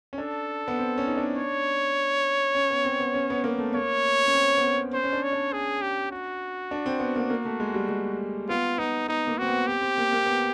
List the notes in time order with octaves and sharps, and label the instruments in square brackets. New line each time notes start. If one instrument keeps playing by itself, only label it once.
[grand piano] C#4
[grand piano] D4 [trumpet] A4
[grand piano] B3
C4
C#4
D#4
D4
[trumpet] C#5
[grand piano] C#4
B3
C4
B3
C#4
B3
A#3
A3
[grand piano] A#3 [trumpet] C#5
[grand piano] C#4
C4
B3
C4
[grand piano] C#4 [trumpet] C5
[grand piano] C#4
D4
[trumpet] C#5
[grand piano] D4
[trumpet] G#4
G4
F#4
[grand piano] D4
C4
B3
A#3
A#3
A3
G#3
G3
G#3
[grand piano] B3 [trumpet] F4
[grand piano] B3 [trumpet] D#4
[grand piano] B3 [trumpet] D#4
[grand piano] A#3
[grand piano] C4 [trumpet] F#4
[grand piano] B3
[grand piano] C4 [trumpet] G4
[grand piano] C4
A#3
A#3
B3